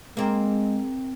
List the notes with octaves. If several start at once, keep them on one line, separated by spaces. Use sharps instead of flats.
G#3 A#3 C4